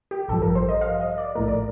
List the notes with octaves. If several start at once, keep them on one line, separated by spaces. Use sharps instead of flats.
G4
A1 G2 F3 A4
A#4
C5
D#5
F5
D#5
D5
A#1 A2 A3 A#4
D5